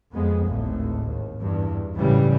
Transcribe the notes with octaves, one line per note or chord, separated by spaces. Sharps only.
F2 G#3 B3
G#1 D2 A2
D#2
E2 G2
A1 G#2 C#3 E3 F#3 G3